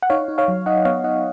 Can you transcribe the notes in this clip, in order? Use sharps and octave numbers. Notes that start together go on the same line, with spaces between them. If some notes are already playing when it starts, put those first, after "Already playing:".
F#5
D#4 C#5 F5
D#4
C#5 F5
F#3
D#4 D#5 F#5
B3 C#5 F5
D#4 D#5 F#5